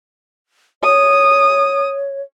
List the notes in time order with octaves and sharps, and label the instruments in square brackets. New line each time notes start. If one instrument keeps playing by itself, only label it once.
[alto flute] C#5 [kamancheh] D#6